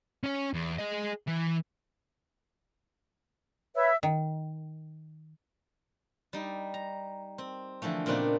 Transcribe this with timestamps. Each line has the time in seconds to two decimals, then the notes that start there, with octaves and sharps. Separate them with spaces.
0.24 C#4 C#5
0.53 E2
0.79 G#4 D#5
1.28 E3
3.75 B4 C#5 E5
4.03 D#3
6.33 G3 D#4
6.74 A#5
7.38 C4
7.82 D3 E3 F3 A3
8.06 A#2 C#3 B3 C4 D4 D#4